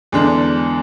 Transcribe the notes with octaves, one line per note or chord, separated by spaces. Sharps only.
E2 D3 G#3 D4